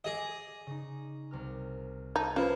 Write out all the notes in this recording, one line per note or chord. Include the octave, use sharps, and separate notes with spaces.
G#4 D5 D#5 G#5
C#3 D#4
C2 A#4 F6
D#4 A5 G#6 D#7
F3 A#3 C#4 A#4 B4